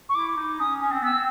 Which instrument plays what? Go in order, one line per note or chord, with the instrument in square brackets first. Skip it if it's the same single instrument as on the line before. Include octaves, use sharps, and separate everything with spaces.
[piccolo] C#6
[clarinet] E4 [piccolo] D6
[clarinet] D#4
[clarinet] C#4 [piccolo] D#6
[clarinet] C#4
C4
[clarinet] B3 [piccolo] E6
[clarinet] C4